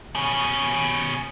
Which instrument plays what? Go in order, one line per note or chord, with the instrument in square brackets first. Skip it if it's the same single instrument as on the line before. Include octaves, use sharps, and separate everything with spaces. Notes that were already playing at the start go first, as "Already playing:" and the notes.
[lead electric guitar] B2 C#4